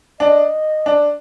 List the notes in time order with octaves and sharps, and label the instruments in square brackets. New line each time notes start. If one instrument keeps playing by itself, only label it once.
[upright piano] D4 [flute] D#5
[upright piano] D4